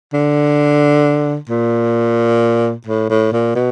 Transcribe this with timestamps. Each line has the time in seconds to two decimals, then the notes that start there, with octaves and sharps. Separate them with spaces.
0.13 D3
1.49 A#2
2.87 A2
3.09 A2
3.32 A#2
3.55 B2